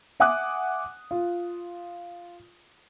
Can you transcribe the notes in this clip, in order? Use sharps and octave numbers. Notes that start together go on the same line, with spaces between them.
E5 F#5 G#5 D6 D#6 F#6
F4